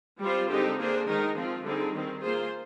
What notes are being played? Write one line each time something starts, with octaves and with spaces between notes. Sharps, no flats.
G3 C4 F4 C5
D3 G#3 C4 D#4 G4
A#3 D4 G#4 C5
D#3 G#3 D#4 A#4
F3 C4 F4
D3 G3 C4 D#4 G#4
D#3 G3 C4
A#3 F4 G#4 C5